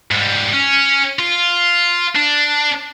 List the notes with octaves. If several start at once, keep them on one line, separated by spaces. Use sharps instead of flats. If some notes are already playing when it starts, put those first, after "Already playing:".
G#2 G3
C#4
F4
D4